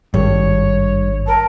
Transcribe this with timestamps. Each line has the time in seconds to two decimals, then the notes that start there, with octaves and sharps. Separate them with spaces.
0.14 G#1 G2 C#5
1.28 A#4 A5